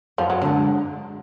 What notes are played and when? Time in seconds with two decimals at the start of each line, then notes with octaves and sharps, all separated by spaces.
0.18 F#2 F3
0.30 F#3
0.42 D3 F#3 G#3